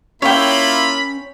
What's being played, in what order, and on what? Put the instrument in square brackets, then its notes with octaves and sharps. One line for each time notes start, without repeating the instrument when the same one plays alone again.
[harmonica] A#3 E4 F4 [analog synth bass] C#4 [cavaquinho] C#5 G5 [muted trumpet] B5